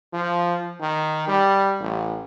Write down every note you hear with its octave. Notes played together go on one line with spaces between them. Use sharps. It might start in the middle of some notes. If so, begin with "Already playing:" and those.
F3
D#3
G3
A1